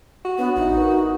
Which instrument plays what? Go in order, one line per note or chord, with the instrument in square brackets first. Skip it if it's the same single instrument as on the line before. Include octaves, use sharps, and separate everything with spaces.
[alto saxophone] F#4
[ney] B3 [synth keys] D4 B4 C#5
[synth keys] A1 E4 E5 [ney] D#4
[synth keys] A#4 B4